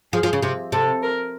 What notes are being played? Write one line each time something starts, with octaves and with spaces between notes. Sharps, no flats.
F3 G#4
F3
C#3
C3
C3 A4
A#4